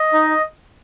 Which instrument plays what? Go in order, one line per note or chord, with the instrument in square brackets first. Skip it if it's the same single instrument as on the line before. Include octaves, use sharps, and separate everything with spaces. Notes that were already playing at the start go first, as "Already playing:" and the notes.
Already playing: [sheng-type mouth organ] D#5
D#4